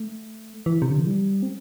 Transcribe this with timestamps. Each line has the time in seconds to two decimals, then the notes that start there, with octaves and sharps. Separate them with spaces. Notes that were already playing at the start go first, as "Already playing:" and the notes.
Already playing: A3
0.66 E3
0.82 C3
0.91 D3
0.99 E3
1.07 G3
1.43 C4